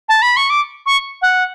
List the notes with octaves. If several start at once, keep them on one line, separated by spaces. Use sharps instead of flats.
A5
B5
C#6
D6
C#6
F#5